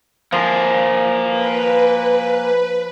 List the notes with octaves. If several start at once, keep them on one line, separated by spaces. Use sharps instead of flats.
F3 A#3 G#4
B4